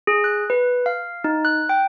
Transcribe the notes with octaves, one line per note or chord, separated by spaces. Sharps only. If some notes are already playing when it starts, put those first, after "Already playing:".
G#4
F#6
B4
F5
D#4
F#6
G5